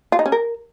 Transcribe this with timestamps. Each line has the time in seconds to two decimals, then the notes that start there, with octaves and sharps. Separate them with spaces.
0.12 F4
0.19 D#4
0.26 C#4
0.32 A#4